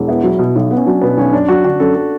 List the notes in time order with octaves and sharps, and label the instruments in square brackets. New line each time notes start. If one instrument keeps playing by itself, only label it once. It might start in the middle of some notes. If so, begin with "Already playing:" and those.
Already playing: [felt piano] E1
[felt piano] B3 [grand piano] E4
[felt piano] F#3
B2
B1
B3
[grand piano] C#4
[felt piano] F#3 [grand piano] D4
[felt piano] B2 [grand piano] B3
[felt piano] B1 [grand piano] C#4
[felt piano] F#2 [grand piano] D4
[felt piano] F#3 [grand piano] F#4
[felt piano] D3 [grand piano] F#4
[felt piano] F#2 [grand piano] A4
[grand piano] A4